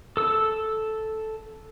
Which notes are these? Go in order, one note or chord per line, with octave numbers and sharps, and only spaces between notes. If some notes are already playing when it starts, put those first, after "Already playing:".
A4 E6